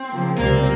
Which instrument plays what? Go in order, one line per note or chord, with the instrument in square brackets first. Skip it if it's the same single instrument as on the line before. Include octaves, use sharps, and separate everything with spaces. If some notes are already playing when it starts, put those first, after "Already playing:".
Already playing: [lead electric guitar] C4
[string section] C#3 F3 A#3
[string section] C#2 C3 G3 C4 [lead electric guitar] A#3